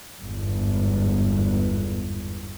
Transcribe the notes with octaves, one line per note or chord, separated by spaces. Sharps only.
G1 E2 G#2